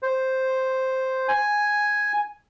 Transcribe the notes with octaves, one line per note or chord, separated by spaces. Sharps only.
C5
G#5